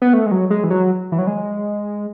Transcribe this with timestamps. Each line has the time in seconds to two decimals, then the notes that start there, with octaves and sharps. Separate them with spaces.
0.02 B3
0.13 A3
0.26 G#3
0.31 F#3
0.50 G#3
0.64 E3
0.70 F#3
1.12 E3
1.18 F#3
1.27 G#3